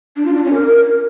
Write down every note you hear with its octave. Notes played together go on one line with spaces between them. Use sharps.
D4
F4
D4
C#4
A#4